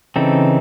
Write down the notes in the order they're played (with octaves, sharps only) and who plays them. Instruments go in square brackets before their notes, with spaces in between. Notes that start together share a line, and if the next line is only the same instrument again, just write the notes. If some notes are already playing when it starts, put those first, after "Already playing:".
[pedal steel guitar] C#3 E3 C4 D#4 A4